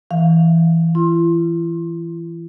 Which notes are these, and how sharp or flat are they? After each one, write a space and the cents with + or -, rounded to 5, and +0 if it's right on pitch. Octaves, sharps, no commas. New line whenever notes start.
E3 +5 F5 +15
E4 +45 C6 +20